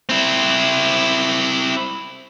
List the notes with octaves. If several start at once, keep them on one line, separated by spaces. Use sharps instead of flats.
C4 E4